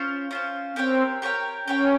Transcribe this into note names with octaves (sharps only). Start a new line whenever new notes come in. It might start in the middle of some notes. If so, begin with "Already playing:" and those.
Already playing: C#4 F4 C5
C#4 F4 C5
C4 G4 A#4 C#5 G5
G4 A#4 C#5 G5
C#4 G4 A#4 C#5 G5